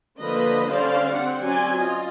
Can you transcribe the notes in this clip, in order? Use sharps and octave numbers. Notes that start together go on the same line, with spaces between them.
D3 F3 A#3 B4 D#5 B5
D3 G3 C#4 C5 D5 F5
C4 G4 F#5
F#3 C4 C#4 G4 D5 G#5
F4 D#5